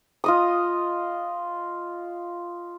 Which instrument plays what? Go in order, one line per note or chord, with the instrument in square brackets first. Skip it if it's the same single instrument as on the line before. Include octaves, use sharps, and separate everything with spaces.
[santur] F4 D#5 D#6